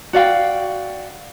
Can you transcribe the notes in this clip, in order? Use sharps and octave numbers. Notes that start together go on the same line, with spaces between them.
F#4 D5 F5 G5